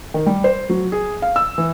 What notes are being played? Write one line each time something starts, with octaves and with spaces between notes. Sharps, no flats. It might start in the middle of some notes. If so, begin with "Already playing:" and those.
D#3
G3
C5
F#3
G#4
F5
E6
E3